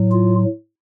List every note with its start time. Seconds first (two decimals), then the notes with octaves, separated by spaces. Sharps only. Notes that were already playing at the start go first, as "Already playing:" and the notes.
Already playing: A2 F#3
0.12 F4